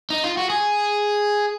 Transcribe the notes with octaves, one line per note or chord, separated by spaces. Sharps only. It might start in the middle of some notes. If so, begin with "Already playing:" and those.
D#4
F4
F#4
G#4